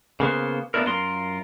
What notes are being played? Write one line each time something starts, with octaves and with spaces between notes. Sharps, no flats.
C#3 A#3 B3 C5
A#3 B3 C#4 D4 E4 A#4
F#2 F4 A#4 C6